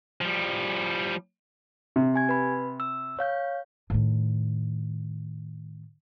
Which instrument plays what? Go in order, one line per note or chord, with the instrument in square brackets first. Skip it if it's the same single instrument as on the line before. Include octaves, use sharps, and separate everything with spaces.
[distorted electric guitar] F3 G3
[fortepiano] C3
[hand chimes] G4 G#5 G#6
B4 B5
E6
C#5 F5 G6
[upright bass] A2 D#3